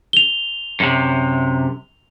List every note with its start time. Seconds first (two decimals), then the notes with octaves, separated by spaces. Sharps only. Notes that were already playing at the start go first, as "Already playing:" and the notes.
0.13 F7 G7
0.80 F#2 C3